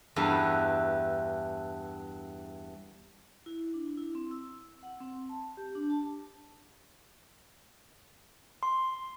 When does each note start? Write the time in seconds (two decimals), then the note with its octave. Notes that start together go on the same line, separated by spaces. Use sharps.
0.16 E2 G2 E3
3.46 E4
3.74 D4
3.97 E4
4.15 C4
4.31 E6
4.83 F#5
5.00 C4
5.29 A5
5.57 G4
5.75 D4
5.90 A5
8.63 C6